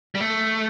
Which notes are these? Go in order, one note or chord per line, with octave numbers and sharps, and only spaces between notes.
G3
A3